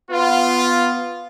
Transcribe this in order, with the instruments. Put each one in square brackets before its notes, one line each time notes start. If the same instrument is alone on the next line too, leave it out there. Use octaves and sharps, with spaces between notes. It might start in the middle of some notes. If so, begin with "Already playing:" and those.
[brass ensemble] B3 F4